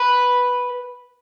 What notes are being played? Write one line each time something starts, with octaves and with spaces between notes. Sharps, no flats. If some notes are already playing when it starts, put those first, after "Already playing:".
Already playing: B4